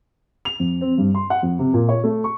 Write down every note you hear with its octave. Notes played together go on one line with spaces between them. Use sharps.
F7
F2
C4
G2
C6
F#5
F2
C3
A#2
C#5
A3
C#6